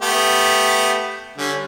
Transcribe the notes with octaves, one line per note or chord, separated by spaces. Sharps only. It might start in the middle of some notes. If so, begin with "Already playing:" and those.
A3 B3 G4
D3 G3 C#4